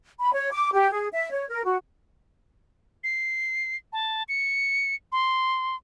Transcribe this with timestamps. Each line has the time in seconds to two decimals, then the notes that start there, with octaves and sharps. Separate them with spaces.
0.19 B5
0.33 C#5
0.51 D6
0.73 G4
0.91 G#4
1.12 E5
1.31 C#5
1.48 A#4
1.64 F#4
3.04 C7
3.93 A5
4.29 C#7
5.12 C6